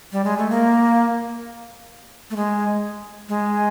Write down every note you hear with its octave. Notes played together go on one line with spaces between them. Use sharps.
G3
G#3
A3
A#3
A3
G#3
G#3